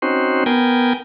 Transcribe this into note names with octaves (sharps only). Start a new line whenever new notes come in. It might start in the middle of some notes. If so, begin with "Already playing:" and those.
C4 C#4 D#4 F#4 C5
B3 A#4 G5 G#5